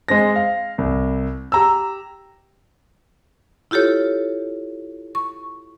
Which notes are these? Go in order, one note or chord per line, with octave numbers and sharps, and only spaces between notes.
G#3 C4 A#6
F5
C2
G4 A#5 E6
E4 F4 G4 A4 C#5
C#6